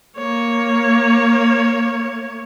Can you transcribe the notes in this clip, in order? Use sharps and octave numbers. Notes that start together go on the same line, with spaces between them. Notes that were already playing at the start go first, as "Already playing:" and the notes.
A#3 C#5